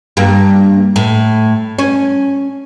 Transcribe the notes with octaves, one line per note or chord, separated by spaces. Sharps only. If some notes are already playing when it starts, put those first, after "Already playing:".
G2 A#3
A2
C#4